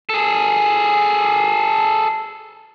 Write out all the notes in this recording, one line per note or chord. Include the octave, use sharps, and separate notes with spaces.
G#4 A4